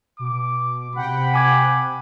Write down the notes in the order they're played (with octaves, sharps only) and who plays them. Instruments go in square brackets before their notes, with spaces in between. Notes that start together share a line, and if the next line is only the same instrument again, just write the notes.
[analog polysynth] B2 [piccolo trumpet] D6
[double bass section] C3 [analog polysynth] F#5 G5 [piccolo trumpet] B5
[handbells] G#5 D6 G#6